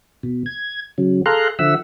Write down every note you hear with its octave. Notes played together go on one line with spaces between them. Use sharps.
B2
G#6
C#3 F#3
G#4 A4 F5 A#5 C6 F#6
D3 F3 E5 F#5 E6